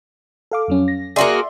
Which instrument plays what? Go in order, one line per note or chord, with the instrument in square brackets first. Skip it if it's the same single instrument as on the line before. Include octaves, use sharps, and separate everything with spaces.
[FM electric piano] A4 F5 D6
F2 F#3 C#4
A#6
[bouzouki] A#3 F#4 G#4 [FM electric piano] D5 E5 C6